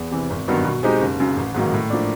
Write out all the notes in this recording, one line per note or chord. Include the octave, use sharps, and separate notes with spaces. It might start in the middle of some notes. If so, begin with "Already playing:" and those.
Already playing: E2
C3 E3
G#1
G2 D#3 F#3 B3
B2
G#3 C4 D#4 G4
F#1
F#2 C#3
A1
G#2 D#3 F#3 A#3
A2
F3 A#3 D4